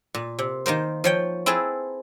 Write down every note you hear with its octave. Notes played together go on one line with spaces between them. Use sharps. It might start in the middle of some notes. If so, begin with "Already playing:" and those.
A#2
C3
D#3 A#3 A#4 C5
F3 C#5 G5
C4 E4 G#4 B4 A5